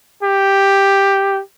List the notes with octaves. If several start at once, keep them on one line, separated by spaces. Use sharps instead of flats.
G4